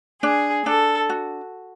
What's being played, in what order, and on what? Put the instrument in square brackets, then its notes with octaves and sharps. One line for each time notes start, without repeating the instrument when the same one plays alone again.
[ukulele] D4 [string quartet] G#4
[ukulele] D4 [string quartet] A4
[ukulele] F#4